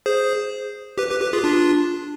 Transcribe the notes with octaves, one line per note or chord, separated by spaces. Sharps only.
G#4 C5
G4 B4
G4 B4
G4 B4
F4 G#4
G4
D4 F4